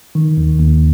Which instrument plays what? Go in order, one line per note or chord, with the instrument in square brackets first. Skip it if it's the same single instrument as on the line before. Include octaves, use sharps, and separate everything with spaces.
[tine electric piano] D#3
D#2
D#2